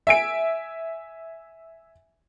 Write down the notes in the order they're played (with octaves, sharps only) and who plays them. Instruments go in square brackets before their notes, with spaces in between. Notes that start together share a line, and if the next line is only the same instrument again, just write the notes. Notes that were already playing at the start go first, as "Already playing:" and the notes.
[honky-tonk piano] E5 G#5 D7